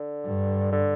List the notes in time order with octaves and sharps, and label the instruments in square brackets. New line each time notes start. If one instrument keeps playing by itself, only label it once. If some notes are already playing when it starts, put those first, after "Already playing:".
Already playing: [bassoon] D3
[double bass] G2
[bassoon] D3